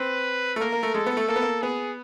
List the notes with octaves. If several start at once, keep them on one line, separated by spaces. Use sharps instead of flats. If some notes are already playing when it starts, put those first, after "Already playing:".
Already playing: C4 B4
A3
A#3 A#4
A#3
A3
G#3 A4
B3
A3
A#3 A4
B3
A#3
B3 G#4